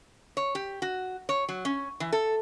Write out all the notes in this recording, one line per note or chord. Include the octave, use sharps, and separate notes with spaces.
C#5
G4
F#4
C#5
F#3
C#4
E3
A4